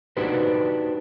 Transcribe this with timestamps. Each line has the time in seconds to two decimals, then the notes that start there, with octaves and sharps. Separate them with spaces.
0.17 D4 D#4 F#4 G4 B4 C5